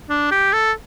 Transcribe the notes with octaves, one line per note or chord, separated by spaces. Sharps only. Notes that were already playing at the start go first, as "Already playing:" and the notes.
D4
G4
A4